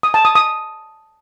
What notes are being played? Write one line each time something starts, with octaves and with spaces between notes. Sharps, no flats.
D#6
A5
D#6
D#6